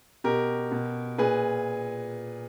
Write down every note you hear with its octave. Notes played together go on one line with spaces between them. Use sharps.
B2 G4 A#4
B2
A#2 G#4 B4